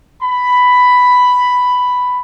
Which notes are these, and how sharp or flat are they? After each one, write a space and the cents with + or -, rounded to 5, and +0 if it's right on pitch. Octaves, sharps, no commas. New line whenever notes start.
B5 +5